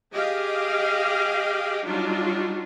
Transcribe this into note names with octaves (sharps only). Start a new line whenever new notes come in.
G4 G#4 D#5 F5
F#3 G3 D4 D#4 F4